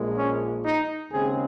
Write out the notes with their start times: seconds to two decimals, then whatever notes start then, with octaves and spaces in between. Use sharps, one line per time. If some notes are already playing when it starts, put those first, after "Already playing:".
Already playing: A#1 A#2 G#3
0.17 C#4
0.64 D#4
1.11 D#2 C#3 G#3 C4 G#4